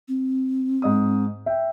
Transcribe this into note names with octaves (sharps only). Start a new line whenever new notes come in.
C4
G#2 D#5 D#6
E5 G5